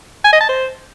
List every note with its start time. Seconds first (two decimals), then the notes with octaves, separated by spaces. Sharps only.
0.24 G#5
0.33 D#5
0.41 A5
0.49 C5